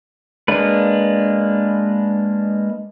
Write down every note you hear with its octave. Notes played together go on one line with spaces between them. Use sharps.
G#3 A#3 D4 B4